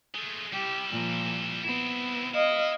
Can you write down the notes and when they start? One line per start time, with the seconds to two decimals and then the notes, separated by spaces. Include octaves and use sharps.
0.15 G#3 A3
0.53 G3 E4 G4
0.91 A#2 F3
1.63 B3 C4 E4
2.34 E4 D#5 F5